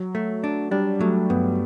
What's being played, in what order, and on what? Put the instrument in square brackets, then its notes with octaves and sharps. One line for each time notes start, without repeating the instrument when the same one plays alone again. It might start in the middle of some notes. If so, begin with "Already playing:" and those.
Already playing: [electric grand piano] F#3
[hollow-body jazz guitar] A3
D4
[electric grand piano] G3 [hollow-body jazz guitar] D4
[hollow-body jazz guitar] F#3 [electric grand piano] A3
[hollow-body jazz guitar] G2 [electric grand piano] B3